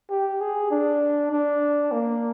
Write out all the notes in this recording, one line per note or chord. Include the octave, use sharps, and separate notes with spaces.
G4
G#4
D4
D4
A#3